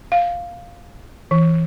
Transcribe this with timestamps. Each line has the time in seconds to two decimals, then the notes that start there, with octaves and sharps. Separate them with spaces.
0.12 F5
1.31 E3